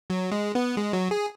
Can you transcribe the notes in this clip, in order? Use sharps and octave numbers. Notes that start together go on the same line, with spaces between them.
F#3
G#3
B3
G#3
F#3
G#4